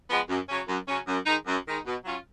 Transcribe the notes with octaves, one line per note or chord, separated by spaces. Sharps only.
F3 G#3 B3
F#2
C#3 F#3 C#4
F#2
C#3 F#3 C#4
F#2
D#3 G#3 D#4
F#2
D#3 G#3 D#4
B2
F#3 C#4 F4